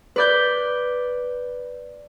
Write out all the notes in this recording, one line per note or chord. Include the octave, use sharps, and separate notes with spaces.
B4 D5 G6